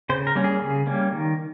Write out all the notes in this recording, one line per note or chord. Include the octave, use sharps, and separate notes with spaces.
C#3 C5
A#4
G3 A#3 C#4
G#4
C#3
G3 A#3 C#4
D#3